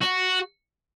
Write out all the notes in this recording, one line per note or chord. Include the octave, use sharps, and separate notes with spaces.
F#4